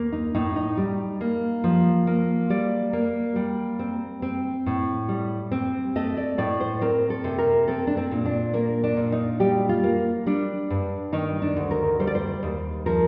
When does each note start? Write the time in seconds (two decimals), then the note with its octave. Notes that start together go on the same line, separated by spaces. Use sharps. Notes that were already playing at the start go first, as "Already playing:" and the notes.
Already playing: D#2 A#3
0.12 D#4
0.35 A2 D#4
0.56 D#4
0.77 G3
1.21 A#3
1.64 F3
2.07 A#3
2.50 G3 D5
2.93 A#3
3.36 G3
3.79 C4
4.22 C4
4.66 A2
5.09 G3
5.52 C4
5.96 A3 D#5
6.17 D5
6.38 A2 D5
6.61 C5
6.81 C4 A#4
7.10 A4
7.24 C3
7.39 A#4
7.68 C4 A4
7.87 D4
7.97 C4
8.11 A#2
8.26 D4
8.54 A#3 A#4
8.84 D4
8.97 A#2
9.12 D#4
9.40 G3 G4
9.69 F4
9.84 A#3
10.26 G3 D4
10.70 G2
11.13 D#3 D#4
11.42 D4
11.57 D2
11.71 A#4
11.99 G3 C5
12.07 D5
12.15 C5
12.43 D#2
12.86 F3 A#4